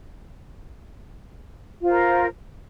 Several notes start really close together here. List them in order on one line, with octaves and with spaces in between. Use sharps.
F4 C5 A#4